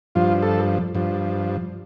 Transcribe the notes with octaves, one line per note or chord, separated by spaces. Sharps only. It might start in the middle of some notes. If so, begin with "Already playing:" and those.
G2 F3 F4
A4
G2 F3